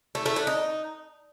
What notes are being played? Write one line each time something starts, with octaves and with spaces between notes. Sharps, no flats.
A3
A3
D4
D#4